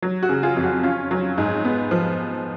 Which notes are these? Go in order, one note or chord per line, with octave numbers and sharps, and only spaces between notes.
F#3
F#4
C#3
F4 G#4
F2
F#4
C#4 F4
F#3
G#2
B3
F3